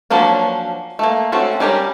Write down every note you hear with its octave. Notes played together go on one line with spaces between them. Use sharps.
F3 F#3 A#3 C#4 D4
A3 A#3
A3 C4 C#4 F#4
G3 C#4 G4 A#4